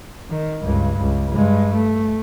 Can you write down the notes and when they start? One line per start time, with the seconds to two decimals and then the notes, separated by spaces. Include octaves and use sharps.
0.30 D#3
0.64 C#2 G2
1.00 C#2
1.34 G2 G#3
1.74 A3